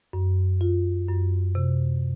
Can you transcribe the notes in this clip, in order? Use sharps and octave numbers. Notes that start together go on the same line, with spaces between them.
F#2
F4
F#2
C3